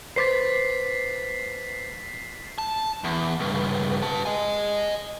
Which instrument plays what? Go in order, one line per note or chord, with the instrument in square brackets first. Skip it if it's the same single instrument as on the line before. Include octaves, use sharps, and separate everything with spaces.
[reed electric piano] B4 C5 D6 [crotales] A6 B6 C7
[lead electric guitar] A5
E2
C#2 G2
B4 A5
D#5 G#5